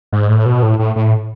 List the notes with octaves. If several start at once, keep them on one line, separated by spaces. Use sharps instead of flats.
G#2
A2
B2
A2
A2
A2